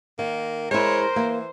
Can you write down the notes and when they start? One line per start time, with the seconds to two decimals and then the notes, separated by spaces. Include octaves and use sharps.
0.19 D#3 A#3
0.71 G#3 E4 A#4 C5 C#5
1.16 E3 A#3